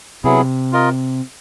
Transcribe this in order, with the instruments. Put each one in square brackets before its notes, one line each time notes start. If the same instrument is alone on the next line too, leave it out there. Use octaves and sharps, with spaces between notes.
[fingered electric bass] C3 [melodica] F#3 B3 E4 G#4
[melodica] F4 A#4 D#5